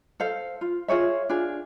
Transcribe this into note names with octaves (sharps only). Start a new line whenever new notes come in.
A4 C5 F5
F4
F4 G#4 C#5 E5
D4 F4 G#4